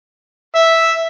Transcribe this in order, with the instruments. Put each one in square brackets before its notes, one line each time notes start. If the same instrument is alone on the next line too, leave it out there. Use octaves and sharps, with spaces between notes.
[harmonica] E5